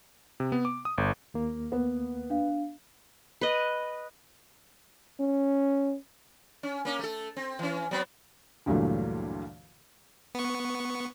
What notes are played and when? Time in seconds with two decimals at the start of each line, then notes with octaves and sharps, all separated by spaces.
0.40 C3
0.52 B3
0.65 D6
0.85 D#6
0.98 G1
1.34 D#2 A#3
1.72 B3
2.30 D4 F5
3.41 B4 D#5
5.20 C#4
6.63 C#4
6.85 A#3 C#4
6.99 A3 A4
7.37 C4
7.59 E3 C#4
7.91 F#3 B3 C4
8.66 D2 G2 A#2 E3 F#3 A3
10.35 B3 C#6